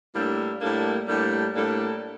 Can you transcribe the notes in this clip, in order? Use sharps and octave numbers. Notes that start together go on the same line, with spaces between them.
A2 G3 A#3 D4 A4
A2 G3 A#3 D4 A4
A2 G3 A#3 D4 A4
A2 G3 A#3 D4 A4